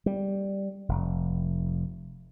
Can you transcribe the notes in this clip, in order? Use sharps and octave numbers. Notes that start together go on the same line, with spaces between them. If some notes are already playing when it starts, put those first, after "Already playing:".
G3
F1